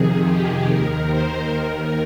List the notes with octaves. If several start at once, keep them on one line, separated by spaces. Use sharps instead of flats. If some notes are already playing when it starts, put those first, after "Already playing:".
Already playing: F2 C3 D#3 G#4
G4
D#2 D#3 A#4
C5
D#2 D#3 A#4